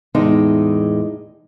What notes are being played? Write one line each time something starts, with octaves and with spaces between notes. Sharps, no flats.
E2 A2 G#3 D#4 D5